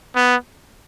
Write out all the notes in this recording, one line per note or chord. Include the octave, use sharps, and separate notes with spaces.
B3